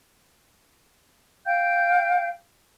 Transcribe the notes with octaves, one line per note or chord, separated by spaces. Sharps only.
F5 G5 G6